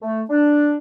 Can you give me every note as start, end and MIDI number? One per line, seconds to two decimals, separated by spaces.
0.02 0.22 57
0.29 0.77 62